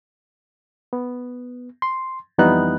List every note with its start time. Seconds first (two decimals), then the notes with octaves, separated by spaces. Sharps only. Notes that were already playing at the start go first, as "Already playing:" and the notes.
0.93 B3
1.82 C6
2.38 F2 E3 G3 B3 D#4 F#6